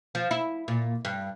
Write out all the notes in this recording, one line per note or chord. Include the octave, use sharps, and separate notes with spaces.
F3
E4
A#2
G2